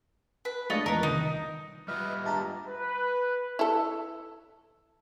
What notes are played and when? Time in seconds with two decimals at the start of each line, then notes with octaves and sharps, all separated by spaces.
0.45 B4
0.70 G#3 A3 D4 F4 C#5 D#5
0.86 E2 A#4 B4
1.03 C2 D#3 D#4
1.88 G3 F4 B4 D#5 E5 F6
2.25 G2 G#3 G4 E5 A5 A#5
2.69 B4
3.59 E4 A4